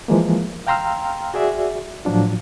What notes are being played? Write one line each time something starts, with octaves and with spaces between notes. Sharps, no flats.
E3 F3 G#3 A#3
F5 G5 A#5 C6 E6 F6
F#4 G#4 D5 E5
A2 F3 F#3 D4 F4